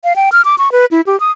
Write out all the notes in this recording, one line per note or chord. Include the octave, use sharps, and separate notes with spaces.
F5
G5
F6
D6
C#6
B4
E4
G4
D#6